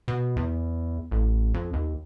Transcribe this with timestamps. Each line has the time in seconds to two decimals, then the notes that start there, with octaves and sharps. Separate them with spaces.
0.08 B2
0.36 E2
1.11 A1
1.54 F2
1.73 D#2